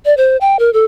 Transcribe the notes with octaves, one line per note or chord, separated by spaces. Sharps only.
D5
C5
G5
A#4
A4